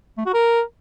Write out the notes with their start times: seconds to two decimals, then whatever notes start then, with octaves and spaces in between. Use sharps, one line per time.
0.18 A3
0.26 F#4
0.34 A#4